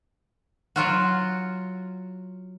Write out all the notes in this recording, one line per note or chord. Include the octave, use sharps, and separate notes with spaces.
F#3 F4 F#4